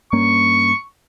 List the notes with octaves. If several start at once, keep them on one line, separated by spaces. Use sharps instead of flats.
G2 A#3 C#4 C#6